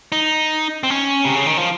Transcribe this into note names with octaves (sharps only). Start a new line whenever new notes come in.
D#4
C4
C#4
C3
C#3
D#3
F3